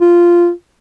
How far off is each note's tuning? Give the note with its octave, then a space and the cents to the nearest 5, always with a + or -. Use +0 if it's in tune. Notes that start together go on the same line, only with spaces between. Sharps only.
F4 -10